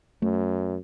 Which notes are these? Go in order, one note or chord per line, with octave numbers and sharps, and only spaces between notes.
F#2 A3